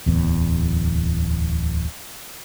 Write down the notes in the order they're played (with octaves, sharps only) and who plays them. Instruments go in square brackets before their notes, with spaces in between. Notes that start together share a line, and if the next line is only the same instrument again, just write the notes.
[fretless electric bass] D1 E2